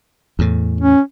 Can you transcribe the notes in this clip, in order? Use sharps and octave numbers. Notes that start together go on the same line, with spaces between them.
E2 A2
C#4